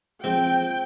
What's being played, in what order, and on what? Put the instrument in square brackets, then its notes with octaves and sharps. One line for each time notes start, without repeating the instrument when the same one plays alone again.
[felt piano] F3 G#4 C5 [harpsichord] C4 [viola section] G5